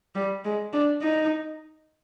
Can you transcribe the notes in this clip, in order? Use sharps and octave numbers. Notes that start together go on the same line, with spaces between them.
G3
G#3
D4
D#4